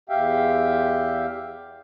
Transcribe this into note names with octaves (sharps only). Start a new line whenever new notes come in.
E2 G4 E5 F5 G5